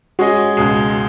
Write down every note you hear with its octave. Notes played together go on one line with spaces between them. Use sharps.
G#3 C#4 F#4 G#4 D#5
C#2 B2 G#3